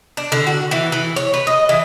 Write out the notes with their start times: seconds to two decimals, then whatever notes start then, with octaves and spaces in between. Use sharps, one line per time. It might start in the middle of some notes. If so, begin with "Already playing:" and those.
0.17 D4
0.32 D3
0.47 F#4
0.71 E3
0.92 E3
1.16 C#5
1.34 B4
1.47 D#5
1.69 E3